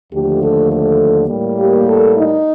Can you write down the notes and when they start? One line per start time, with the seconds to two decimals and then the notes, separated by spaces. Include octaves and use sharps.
0.12 D#2 D3 F3 A3 G4
0.41 A4
0.70 A4
1.29 A2 G3 A#3
1.59 G4
1.87 A4
2.17 D#4